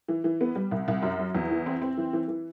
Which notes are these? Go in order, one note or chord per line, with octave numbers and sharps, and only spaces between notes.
E3
E3
B3
G3
C2
C2
F#2
F#3
E2
E3
C4
C4
E3
E3
E3